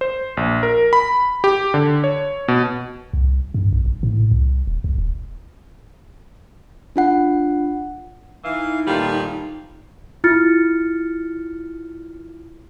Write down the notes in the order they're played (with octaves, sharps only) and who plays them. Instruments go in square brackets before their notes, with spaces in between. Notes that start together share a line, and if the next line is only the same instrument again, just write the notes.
[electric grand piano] C5
A#1
A#4
B5
G4
D3
C#5
B2
[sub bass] C2
G2
A#1
A1
A2
C2
D#1
C#2
D#1
[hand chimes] D4 F4 F#5
[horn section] E3 [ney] D#4 [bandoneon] F5
[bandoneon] A#2 D#3 A#3 [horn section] F3 A3 F4 [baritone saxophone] G3
[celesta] E4 F4 F6 A6 C#7